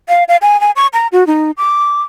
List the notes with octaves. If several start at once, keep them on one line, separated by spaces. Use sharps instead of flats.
F5
F5
G#5
G#5
C#6
A#5
F#4
D#4
D6